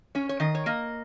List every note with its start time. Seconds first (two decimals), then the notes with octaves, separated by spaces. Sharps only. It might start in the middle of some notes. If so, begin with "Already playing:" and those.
0.15 C#4 C#5
0.29 C#5
0.40 D#3 D#5
0.55 C#5
0.66 A#3 D#5